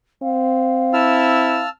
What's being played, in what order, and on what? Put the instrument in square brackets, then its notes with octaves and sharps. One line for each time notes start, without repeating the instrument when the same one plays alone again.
[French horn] C4 [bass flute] F5
[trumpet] E4 [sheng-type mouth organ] A5 E6 F6